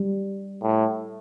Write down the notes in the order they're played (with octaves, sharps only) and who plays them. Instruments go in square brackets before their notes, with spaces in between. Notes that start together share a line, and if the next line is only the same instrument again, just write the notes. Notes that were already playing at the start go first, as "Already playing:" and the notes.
Already playing: [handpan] G3
[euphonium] A2